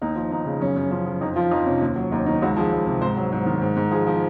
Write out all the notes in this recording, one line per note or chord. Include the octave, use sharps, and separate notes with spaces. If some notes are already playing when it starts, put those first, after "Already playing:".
D#2 D#4
F3
D#2 D#4
C#3
F#2 C#4
F#2
F3 C#4
F3
F2 D#4
F3 F4
F2 D#4
C3 C#4
D#2
F#3
D#2 D#4
D#3 D#4
C#2 F#4
F3 G#4
C#2
C3
G#2 C5
F#3
G#2 C5
D#3
G#2
G#2
F3 G#4
F3